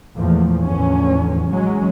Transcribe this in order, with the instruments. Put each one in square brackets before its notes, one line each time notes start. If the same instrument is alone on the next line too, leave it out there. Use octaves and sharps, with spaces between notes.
[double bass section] E2 A#2 F3 A3
A1 E2 D3 F3 C#4
E3 F#3 G#3 C#4